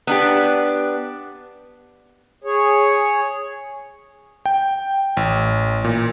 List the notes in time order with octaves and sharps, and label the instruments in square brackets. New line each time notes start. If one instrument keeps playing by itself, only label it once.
[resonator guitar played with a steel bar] B3 D4 G4
[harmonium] G#4 C#5
[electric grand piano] G5
A1
A#2